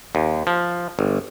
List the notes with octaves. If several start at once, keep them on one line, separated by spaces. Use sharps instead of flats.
D#2
F3
G1